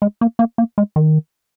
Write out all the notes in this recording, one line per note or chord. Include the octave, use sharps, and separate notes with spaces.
G#3
A#3
A#3
A#3
G#3
D#3